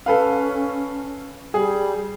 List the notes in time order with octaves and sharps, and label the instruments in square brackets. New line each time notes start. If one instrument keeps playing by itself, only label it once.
[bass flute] C#4 [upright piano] A4 B4 F5
[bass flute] G3 [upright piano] G#4